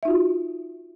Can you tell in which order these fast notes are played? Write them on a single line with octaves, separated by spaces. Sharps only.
E5 D#4 F4 F#4